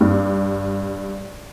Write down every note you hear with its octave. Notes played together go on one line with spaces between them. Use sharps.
G2